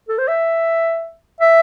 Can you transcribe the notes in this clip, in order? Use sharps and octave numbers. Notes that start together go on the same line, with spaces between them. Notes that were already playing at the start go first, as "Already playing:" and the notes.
A4
C5
E5
E5